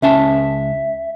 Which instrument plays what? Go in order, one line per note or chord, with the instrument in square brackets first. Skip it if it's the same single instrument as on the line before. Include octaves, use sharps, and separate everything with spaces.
[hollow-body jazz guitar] C#2 C#4 A5 [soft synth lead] E5